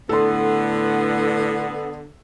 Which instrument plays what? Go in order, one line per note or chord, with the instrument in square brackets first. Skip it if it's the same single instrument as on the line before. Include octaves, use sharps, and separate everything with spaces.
[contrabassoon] A2 [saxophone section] D3 B3 [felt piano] A4 C6